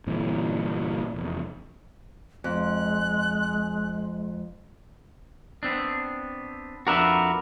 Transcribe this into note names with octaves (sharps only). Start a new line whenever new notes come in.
G1 A#2 E3 C4
F1 E2
F2 G#3 F#6
B3 C4 D4
F2 D4 F#4 A#4 B4 E5